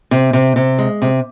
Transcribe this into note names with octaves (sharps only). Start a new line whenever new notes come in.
C3
C3
C3
G#3
C3